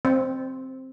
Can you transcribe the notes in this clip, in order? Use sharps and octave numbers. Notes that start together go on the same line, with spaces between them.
C4